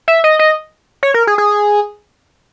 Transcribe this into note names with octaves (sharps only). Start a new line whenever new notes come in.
E5
D#5
D#5
C#5
A#4
G#4
G#4